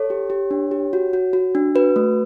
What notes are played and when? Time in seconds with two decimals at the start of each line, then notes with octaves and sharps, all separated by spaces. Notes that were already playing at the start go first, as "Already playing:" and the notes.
Already playing: A4 C#5
0.10 G4
0.30 G4
0.51 D4
0.71 G4
0.93 F#4
1.13 F#4
1.33 F#4
1.55 D4
1.75 F#4 B4
1.96 A3